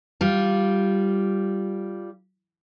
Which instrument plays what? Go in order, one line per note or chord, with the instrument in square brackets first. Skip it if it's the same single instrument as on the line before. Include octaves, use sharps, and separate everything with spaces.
[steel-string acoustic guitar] G3 F4